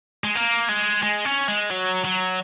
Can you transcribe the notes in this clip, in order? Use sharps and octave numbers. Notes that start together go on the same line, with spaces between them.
G#3
A#3
G#3
G#3
C#4
G#3
F#3
F#3